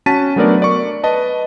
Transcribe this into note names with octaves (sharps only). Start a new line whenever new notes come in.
C#4 F#4 A5 A6 B6 D#7
F#3 A3 B3 D4 A#4 D5
D5 C#6
B4 D#5 A5